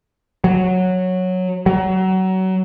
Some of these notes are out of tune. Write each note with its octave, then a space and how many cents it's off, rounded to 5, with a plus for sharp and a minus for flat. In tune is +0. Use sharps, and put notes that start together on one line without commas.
F#3 -10
F#3 +25